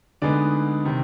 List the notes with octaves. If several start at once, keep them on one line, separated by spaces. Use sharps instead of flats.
D2 D3 G#3 B3 D#4 D5
C3 D#3